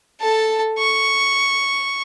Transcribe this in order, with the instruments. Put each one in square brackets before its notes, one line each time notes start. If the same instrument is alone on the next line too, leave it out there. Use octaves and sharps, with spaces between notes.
[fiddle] A4 A5
C#6